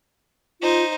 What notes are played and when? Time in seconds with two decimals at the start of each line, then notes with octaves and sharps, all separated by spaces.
0.61 D#4 F4 C5